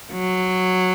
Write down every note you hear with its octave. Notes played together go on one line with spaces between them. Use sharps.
F#3